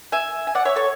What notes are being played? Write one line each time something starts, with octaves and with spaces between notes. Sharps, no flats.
E5 G#5
G#5
D5 F#5
C#5 E5
A4 C#5